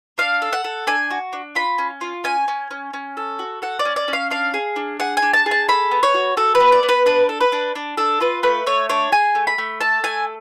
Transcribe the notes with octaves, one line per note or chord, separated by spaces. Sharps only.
D4 F5
A4
F#5
A4
D4 G#5
F#4
D4
F4 B5
C#4
F4
C#4 G#5
C#4
C#4
C#4
A4
F#4
A4 F#5
D5
C#4
D5
C#4
F5
D4 F5
G#4
D4
G#4 F#5
G#5
D4
A5
G#4
A5
A4 B5
B3
C#5
F#4
F#4 A4
B4
B3
D5
B3
B4
D4 B4
A4
B4
D4
D4
D4 A4
F4 B4
A3 B4
A3 C#5
D4 C#5
G#4 G#5
A3
B5
A3
A4 A5
A3 G#5